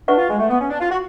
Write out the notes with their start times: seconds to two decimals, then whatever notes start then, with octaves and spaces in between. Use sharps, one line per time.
0.08 D4 B4 F#5 C#6
0.18 F4
0.29 G#3
0.39 A3
0.50 B3
0.60 C#4
0.70 D4
0.80 F4
0.91 F#4